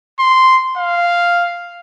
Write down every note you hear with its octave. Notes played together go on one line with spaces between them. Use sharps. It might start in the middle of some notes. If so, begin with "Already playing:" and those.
C6
F5